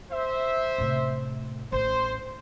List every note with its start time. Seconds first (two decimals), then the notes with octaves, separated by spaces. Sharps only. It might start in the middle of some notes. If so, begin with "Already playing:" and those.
0.11 C5 E5
0.78 A2 C3
1.72 A1 C5